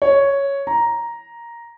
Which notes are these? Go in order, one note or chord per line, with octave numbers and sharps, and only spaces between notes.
C#5
A#5